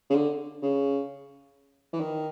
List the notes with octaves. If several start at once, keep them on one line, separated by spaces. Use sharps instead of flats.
C#3
D3
C#3
E3
D#3